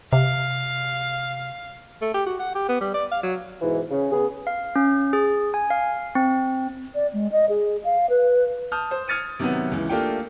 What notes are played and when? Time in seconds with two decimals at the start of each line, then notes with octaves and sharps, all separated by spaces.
0.13 C3 F5
2.02 A3
2.14 G4
2.27 F#4
2.39 F#5
2.55 G4
2.69 B3
2.81 G3
2.94 D5
3.12 F5
3.23 F#3
3.62 G#2 B2 E3
3.91 C#3
4.12 C#3 B3 G#4
4.47 F5
4.76 C#4
5.13 G#4
5.54 G#5
5.70 F5
6.15 C4
6.95 D5
7.13 G#3
7.32 D#5
7.49 G#4
7.84 F5
8.10 B4
8.72 A5 D#6 F6 G6
8.91 C5
9.08 D#6 F6 G#6 A6 C#7 D#7
9.39 C3 D#3 F#3 B3
9.71 C#2 E3
9.89 A3 A#3 D4 F4 G4 G5